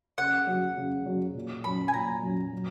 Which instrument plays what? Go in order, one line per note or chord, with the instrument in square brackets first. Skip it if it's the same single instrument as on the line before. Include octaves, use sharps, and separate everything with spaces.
[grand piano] C#3 [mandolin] F#5
[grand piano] F#3 C#4 F#4
C#3
F#3 C#4 F#4
A#2
[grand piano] F#3 C#4 [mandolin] B5
[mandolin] G#5
[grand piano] A#2 [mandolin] A#5
[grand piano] F#3 C#4
F#3